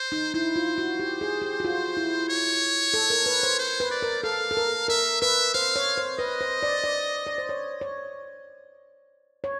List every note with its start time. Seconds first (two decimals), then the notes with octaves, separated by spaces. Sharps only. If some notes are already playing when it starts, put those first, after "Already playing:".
Already playing: C5
0.12 D#4
0.34 E4 C5
0.56 F4
0.78 F#4
1.00 G4
1.21 G#4
1.42 G4
1.60 F#4
1.65 F4
1.97 E4
2.29 C#5
2.94 A4
3.10 A#4
3.26 B4
3.43 C5
3.59 C5
3.80 B4
3.91 D5
4.02 A#4
4.23 A4 F5
4.51 A4
4.57 A#4
4.88 A#4 E5
5.22 B4 E5
5.54 C5 F5
5.76 C#5
5.97 C5
6.19 B4 D#5
6.41 C5
6.63 D5
6.84 D5
7.27 D5
7.38 C5
7.49 C#5
7.81 C#5
9.44 C#5